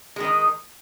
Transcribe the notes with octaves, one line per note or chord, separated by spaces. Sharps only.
D#3 G#3 D#4